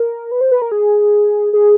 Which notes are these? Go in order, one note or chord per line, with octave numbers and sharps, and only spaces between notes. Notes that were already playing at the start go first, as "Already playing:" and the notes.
Already playing: A#4
B4
C5
B4
A#4
G#4
G#4